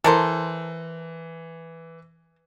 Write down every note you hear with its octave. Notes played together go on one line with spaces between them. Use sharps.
E3 A4 A#4 C5